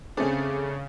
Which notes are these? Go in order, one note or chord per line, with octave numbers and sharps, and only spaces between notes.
C#3 A3 C4 D4 G#4